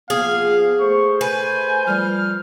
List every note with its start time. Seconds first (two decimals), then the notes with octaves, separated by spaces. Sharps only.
0.10 F3 A#3 B3 G#4 F5
0.80 A3 C5 C#6
1.21 B4 G#5 G6
1.87 F3 G3 F6